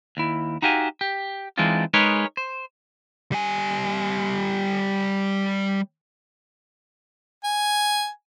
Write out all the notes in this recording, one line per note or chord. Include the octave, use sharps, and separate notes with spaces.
D#2 E4
D#4 F#4 G4 F5 G#5
G4
E3 G#3 C4 D4 D#4 F4
G#3 D#4 G#4 A#4 B4 C#5
C5
G3 G#5
G#5